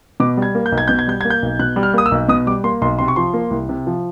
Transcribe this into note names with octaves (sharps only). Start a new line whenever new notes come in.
B2 D6
G3 G#6
A#3
G6
B1
G#6
B2 G6
G#6
G3 G6
A#3 G#6
G6
B1
B2 F#6
G3
F6
A#3 D#6
E6
B1
B2 D#6
G3 D6
A#3 C6
B1 C6
C3 C6
C#6
F3 C6
A#3
C2
C3
F3